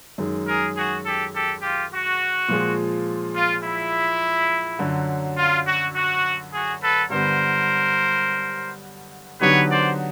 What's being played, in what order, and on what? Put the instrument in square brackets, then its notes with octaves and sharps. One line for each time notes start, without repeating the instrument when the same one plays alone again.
[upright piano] F#2 D#3 G#3
[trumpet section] G#4 A#4
F#4 G#4
G4 A4
G4 A4
F4 G4
F#4
[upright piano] A#2 F3 G#3
[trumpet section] F4
E4
[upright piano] F#2 D3 F#3
[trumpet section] F4
F#4
F#4
F#4 G#4
A4 B4
[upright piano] G2 D3 G3 B3 [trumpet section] A#4 C5
[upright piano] D3 F#3 B3 D#4 G4 [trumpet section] B4 C#5
[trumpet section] C5 D5